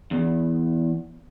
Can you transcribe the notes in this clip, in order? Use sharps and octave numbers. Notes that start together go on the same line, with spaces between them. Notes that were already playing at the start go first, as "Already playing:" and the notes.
E2